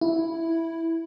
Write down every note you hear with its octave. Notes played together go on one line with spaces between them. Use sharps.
E4